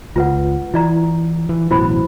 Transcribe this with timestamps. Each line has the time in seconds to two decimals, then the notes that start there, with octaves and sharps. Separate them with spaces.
0.16 C#2 F4 B4 F#5
0.74 E3 E4 D5 A#5
1.49 E3
1.71 A1 F#2 B2 E4 C5 B5